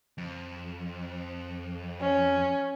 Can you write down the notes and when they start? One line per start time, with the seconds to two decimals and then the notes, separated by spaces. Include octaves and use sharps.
0.18 F2
2.01 C#4